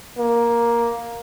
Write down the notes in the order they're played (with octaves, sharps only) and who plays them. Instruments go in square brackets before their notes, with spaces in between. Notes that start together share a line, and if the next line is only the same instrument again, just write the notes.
[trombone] A#3